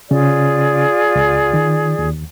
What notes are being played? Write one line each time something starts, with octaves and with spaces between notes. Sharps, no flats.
C#3 C#4 F4 G#4 D5
C#2
D#3
D#2